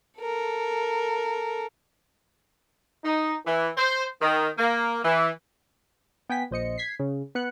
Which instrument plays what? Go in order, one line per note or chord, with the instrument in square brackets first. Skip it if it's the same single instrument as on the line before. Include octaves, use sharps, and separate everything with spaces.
[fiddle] A4 A#4
[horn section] D#4
E3
C5
D#3
A#3
E3
[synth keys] B3 G5 G#5 B6
A#1 C5 D#5 C#7
G#6 B6 C7
C#3
B3 B4 F#6 C#7